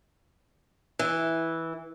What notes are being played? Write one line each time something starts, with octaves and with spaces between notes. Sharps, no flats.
E3